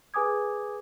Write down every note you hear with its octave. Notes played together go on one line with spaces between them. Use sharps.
G#4 B4 G#5 D6 D#6 G#6